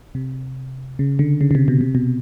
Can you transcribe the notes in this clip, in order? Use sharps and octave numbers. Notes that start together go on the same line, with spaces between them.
C3
C#3
D3
C#3
C#3
C3
B2
C3
B2